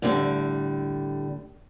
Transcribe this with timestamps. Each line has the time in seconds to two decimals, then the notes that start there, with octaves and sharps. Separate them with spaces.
0.02 A2 D3 G3